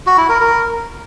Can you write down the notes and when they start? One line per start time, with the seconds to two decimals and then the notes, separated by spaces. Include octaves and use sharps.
0.06 F#4
0.18 E4
0.29 A#4
0.40 A#4